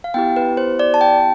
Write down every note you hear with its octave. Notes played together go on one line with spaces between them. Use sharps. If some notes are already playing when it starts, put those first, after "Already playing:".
F5
B3 E4 G4 G5
B4
C5
D5
A5
G5